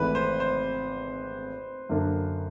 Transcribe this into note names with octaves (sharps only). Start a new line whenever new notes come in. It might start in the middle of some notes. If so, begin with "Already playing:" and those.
Already playing: G#1 G#2 E3 A3 B4
C5
C5
F#2 D3 F#3 A#3 D4